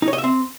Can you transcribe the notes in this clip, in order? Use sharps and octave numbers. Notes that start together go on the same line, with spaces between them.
D#4
C#5
D#5
E5
C4